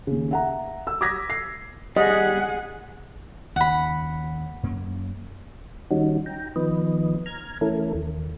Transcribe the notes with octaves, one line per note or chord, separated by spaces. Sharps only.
D#2 C#3
E5 F#5 A#5
E6
D6 D#6 G#6 A#6 B6
C7
G3 G#4 D#5 F#5
D#2 C#3 F#5 B5
F#2 A#3 C#4
D#3 G3 C#4 D#4 F#4
G5 A#5
D#3 F3 B3 B4 D#5
A#5 F6 G#6
E3 A3 C#4 E4 A4 A#4
D#2